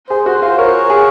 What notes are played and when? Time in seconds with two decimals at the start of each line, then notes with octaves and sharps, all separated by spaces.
0.09 G#4 C5
0.26 F#4 C5
0.42 F4 C5
0.58 A#4 C#5
0.90 G#4